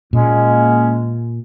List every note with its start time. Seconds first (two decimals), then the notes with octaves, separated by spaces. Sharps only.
0.13 A#2 G#3 A#3 C#4